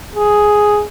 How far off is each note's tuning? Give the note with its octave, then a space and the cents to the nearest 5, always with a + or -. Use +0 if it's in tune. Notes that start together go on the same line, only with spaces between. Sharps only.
G#4 +5